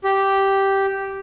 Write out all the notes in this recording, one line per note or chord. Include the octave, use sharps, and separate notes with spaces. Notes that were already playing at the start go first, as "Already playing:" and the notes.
G4